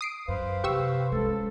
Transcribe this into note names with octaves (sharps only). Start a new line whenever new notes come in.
D#6 C7 D7
F#2 B4 C5 F5
C3 G4 C#6 E6
G#3 C#4 A4